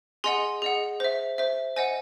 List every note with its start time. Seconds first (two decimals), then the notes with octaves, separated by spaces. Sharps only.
0.24 G#4 D#5 F#5 G#5 C6
0.62 G#4 D#5 F#5
1.00 C5 E5
1.38 C5 E5
1.76 C5 D#5 F#5 G#5